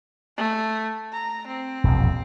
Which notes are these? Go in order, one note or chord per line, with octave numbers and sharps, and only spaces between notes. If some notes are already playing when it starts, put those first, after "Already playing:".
A3
A#5
C4
E1 A#1